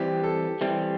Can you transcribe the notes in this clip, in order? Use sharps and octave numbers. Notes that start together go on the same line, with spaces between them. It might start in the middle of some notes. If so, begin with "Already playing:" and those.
Already playing: E3 G3 C4 G4
A4
E3 G3 C4